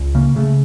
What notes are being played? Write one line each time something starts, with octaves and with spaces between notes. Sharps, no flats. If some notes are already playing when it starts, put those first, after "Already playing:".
Already playing: C#2
C#3 A#3
C#3 A3